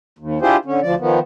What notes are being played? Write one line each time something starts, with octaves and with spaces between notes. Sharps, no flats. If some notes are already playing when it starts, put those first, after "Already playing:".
D#2
D4 E4 F4 G4 G#4 C5
D3 C#4
D2 F3 D5
D#3 F3 B3